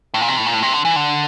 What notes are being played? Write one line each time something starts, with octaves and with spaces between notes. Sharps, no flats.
A2
A#2
C3
A2
A#2
A2
C3
D3
E3
D3